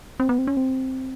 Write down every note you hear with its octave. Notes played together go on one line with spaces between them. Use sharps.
C4
B3
C4
C#4
C4